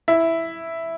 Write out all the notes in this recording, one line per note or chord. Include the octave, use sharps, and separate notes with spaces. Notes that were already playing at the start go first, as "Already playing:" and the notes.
E4